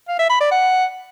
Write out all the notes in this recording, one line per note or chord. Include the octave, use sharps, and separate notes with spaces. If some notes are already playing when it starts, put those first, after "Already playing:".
F5
E5
B5
D5
F#5